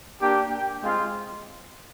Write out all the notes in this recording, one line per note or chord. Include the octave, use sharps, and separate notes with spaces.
A#3 D4 G4 G5
G5
G#3 C4 F4